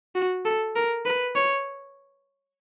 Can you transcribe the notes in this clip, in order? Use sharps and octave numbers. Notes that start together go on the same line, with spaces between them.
F#4
A4
A#4
B4
C#5